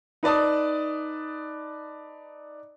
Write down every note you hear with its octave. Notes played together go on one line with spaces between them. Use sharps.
D#4 B4 D5 A5 D#6